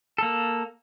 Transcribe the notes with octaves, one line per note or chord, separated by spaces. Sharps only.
A#3 A4